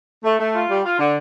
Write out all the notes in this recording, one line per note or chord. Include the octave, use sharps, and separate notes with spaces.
A3
A3
F4
G3
F4
D3